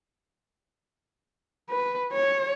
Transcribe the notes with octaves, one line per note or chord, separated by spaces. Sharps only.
B4
C#5